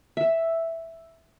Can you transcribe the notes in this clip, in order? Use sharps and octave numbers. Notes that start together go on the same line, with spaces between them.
E5